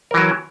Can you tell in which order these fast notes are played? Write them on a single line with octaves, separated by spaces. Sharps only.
A#4 E3 F#3